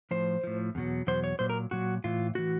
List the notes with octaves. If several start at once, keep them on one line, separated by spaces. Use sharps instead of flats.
A2 F3 C5
A2 F3
E2 B2 F#3
E2 B2 F#3 C5
C#5
A#2 F#3 C5
A#4
A#2 F#3 F#4
A2 E3 F4
A2 E3 F#4